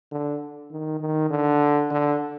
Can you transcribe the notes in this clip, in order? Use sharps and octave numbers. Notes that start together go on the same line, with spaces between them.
D3
D#3
D#3
D3
D3